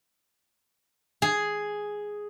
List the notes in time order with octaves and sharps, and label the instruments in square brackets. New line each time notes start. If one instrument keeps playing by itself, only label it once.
[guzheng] G#4